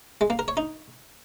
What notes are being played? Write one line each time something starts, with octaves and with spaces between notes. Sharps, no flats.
G#3
A#3
A#4
C#5
D#4